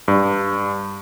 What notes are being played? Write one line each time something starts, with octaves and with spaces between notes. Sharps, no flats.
G2